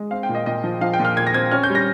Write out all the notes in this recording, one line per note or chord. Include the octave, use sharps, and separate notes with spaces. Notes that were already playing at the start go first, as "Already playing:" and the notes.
Already playing: G#3
C4 F5
G5
A#2
D#5
A#2 D#5
F3
F3 F5
G5
A#2
F6
A#2 G#6
A#6
C4 G#6
C#4 F6
G6
G3
A#6